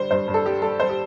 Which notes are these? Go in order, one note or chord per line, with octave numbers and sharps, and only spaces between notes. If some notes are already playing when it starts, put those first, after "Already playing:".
Already playing: D3 G3 C5
G2 C5
G2
A4
G3 G4
G3 A4
G3 C5
G4